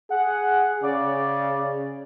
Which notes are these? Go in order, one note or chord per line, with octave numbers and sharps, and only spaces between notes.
G#4 F#5
C#3 D5